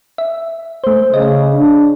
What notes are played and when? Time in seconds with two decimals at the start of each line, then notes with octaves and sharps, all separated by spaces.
0.18 E5
0.84 A3 C5
1.14 C#3 D#5
1.54 D4